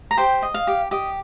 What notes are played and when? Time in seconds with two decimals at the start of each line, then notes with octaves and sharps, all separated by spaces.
0.11 A#5
0.17 G4 C5 G5
0.42 D#5
0.54 F5
0.67 G4
0.91 G4 D#5